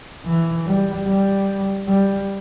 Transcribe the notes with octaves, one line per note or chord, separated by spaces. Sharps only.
E3
G3
G3
G3